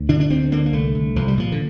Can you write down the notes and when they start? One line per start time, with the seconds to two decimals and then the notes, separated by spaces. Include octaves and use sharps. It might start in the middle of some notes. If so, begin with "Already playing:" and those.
Already playing: D2
0.09 D3 D4
0.20 D4
0.30 D2 C4
0.52 D3 A#3
0.66 A#3
0.73 C2 A3
0.95 C2
1.16 C2 F3
1.28 G3
1.38 A#2 F3
1.52 D3